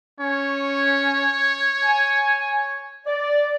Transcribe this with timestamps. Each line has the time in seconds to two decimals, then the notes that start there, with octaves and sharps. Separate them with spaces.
0.20 C#4 C#5
1.85 G#5
3.06 D5